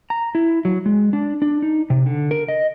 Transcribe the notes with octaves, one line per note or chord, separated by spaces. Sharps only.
A#5
E4
F#3
G#3
D4
D4
D#4
C3
D3
A#4
D#5